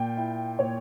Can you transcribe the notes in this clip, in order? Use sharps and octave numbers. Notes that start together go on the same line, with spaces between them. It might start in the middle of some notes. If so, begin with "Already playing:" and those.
Already playing: A#2 G5
E4
A#2 C#5